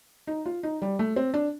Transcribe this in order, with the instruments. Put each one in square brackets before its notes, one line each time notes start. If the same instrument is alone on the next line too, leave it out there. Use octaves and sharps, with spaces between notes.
[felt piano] D#4
F4
D#4
G3
A3
C4
D4